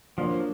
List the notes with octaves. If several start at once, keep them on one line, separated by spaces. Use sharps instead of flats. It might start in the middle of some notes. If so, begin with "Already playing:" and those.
F3 F#3 A#3 D4 F4